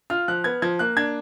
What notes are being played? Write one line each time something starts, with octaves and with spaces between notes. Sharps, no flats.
F4 F6
F3 F#6
B3 G#6
F3 G#6
A#3 F#6
D4 G#6